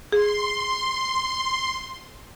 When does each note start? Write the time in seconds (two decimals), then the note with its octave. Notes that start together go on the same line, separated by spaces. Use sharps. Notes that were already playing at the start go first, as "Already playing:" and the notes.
0.12 G#4 C6